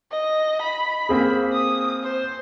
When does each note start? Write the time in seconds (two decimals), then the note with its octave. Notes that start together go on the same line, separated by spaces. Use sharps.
0.11 D#5
0.62 B5
1.09 A#3 C4 G#4
1.53 D#6
2.03 C5